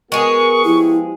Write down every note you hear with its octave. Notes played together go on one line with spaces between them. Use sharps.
G#3 B3 F#4 G#4 A#4 C#6
F3 B3 E4 G4